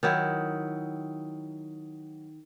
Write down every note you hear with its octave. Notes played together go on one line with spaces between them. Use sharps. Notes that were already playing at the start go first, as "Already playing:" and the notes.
D#3 F#3 E4